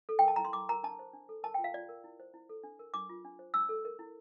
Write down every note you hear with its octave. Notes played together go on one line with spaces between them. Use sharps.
A4
G5
A#4 A5
E4 A#5
C6
E4 D6
A#4 A#5
D4 A5
C5
D4
A4
A#4 A5
G5
F4
F5
F4 D5
A#4
E4
C5
E4
A4
D4
A#4
D4 D6
F4
D4
C5
D4 E6
A4
A#4
E4